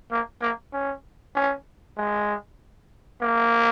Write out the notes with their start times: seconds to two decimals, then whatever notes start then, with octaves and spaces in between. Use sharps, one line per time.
0.11 A#3
0.42 A#3
0.73 C#4
1.35 C#4
1.97 G#3
3.21 A#3